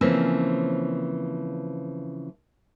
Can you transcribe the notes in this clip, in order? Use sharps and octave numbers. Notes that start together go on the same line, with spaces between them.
C#3 E3 F3 A#3 C4 C#4